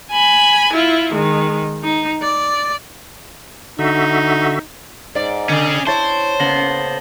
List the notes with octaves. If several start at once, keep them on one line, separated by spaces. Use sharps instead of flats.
G#5 B5
E4 F4
D#3 G#3
D#4
D5
D3 D#4 F#4 E5
G#2 D5
D3 C#4 G#4
E4 C5 C#5 A5 A6
C#3 A#3 B3 A#6 F#7 G7